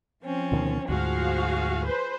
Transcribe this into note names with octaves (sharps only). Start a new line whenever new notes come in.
F3 C4 C#4
D2 B2 D#3
D2 G#2 F3 F#4 G#4 F5
B4 C5